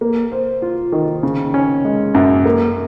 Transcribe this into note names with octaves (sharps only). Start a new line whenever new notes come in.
A#3
C5
F4
D#3
C#3
C#4
G#3
F#2
A#3